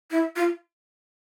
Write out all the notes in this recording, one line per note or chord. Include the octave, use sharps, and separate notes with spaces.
E4
F4